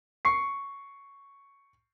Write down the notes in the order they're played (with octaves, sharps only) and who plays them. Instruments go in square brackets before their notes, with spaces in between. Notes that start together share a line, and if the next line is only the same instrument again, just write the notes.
[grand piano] C#6 C7